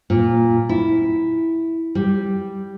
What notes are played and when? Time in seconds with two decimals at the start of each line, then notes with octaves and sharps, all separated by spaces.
0.10 A#2
0.69 E4
1.95 G3